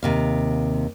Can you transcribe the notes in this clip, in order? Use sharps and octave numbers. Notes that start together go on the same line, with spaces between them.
D#2 C3 F5